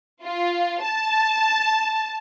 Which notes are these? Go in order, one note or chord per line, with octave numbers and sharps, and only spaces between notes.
F4
A5